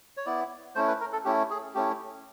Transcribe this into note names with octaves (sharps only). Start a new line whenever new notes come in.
C#5
B3 E4 D5
A3 C#4 E4 C5
B4
A#4
A4
A3 C#4 E4 G4
G#4
A3 C#4 E4 G4